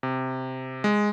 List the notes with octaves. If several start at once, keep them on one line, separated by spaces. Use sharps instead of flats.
C3
G#3